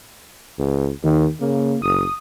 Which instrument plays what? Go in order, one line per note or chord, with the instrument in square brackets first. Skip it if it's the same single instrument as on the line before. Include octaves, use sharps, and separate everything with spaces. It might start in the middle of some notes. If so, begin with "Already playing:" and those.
[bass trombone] C#2
[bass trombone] D#2 [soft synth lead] D#3
[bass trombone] C#3 [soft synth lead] A#3
[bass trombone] F#1 [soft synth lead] D#6